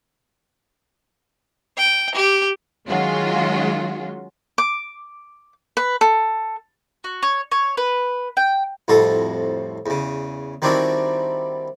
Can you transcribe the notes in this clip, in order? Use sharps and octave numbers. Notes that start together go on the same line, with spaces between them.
G5
G4
D#3 F#3 G#3 C#4 F4 F#4
D6
B4
A4
F#4
C#5
C#5
B4
G5
C2 F2 A2 F#4 A4 D#6
E2 C#3
D#3 G3 C4 D4 E4 F#4